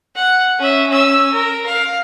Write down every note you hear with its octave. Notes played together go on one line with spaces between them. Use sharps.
F#5
C#4 E5
C#4 E6
A#4
F5